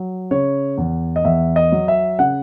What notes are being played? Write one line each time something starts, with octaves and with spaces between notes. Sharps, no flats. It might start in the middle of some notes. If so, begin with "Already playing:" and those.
Already playing: F#3
C#3 C#5
E2
D#5
E2 E5
D#5
F#3
E5
C#3 F#5